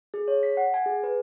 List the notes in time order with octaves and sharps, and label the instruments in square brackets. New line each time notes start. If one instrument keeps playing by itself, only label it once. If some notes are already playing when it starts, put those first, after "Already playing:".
[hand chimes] G#4
C#5
B6
F#5
G#5
G#4
B4